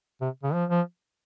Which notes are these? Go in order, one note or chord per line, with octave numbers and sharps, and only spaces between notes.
C3
C#3
F3
F3